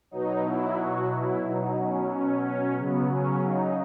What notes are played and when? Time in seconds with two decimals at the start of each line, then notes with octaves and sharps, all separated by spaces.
0.11 B2 F#3 D#4
0.45 E4
0.78 F#4
1.12 E4
1.44 B2 F#3 D#4
1.78 C#4
2.11 C#4
2.44 C#4
2.77 C#3 F#3 B3
3.11 C#4
3.44 D#4